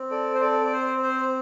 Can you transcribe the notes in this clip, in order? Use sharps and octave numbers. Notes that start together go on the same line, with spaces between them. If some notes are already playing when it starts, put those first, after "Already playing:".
Already playing: C4
A4 D5
C5
A4 D5
D5
C5
C5